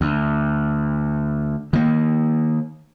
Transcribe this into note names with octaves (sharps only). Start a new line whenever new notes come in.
D2
D#3 A#3